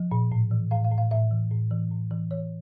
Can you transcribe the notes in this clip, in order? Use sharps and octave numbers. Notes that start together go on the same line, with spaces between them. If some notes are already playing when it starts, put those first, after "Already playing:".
Already playing: F3
A#2
A2
E3
A2 F5
F5
A2
F5
A2 E5
E3
A2
E3
A2
E3
E3 C#5